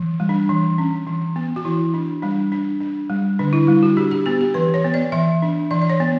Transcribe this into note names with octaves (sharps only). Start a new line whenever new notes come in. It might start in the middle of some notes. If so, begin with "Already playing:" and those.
Already playing: E3
G3
D4
E3
C#4
E3
B3
F#4
E3 E4
D4
G3 D4
D4
D4
G3
D3 D4
E4
G3 E4
F#4
D4 G4
G4
B3 G4
G4
E3 B4
C#5
B3
D5
E3 E5
D4
E3 D5
D5
C#5
B3